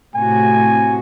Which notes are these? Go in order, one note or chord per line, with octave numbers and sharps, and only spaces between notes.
A2 C3 F#4 G#5